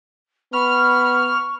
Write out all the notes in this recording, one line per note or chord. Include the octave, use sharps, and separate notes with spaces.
B3 B5 C#6 F6